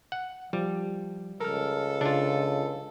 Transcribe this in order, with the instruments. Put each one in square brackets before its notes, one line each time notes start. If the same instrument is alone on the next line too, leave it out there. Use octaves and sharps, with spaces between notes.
[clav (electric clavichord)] F#5
[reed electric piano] F3 [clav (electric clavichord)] G3
[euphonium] C#2 [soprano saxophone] A4 [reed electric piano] A#4 F6
[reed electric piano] C#3 A6 [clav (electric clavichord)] D4 F4